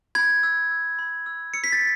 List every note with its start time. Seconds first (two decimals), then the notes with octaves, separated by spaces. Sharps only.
0.15 B5 G#6
0.43 E6
0.71 E6
0.99 B5
1.26 E6
1.54 E6 C#7
1.64 B6
1.72 A6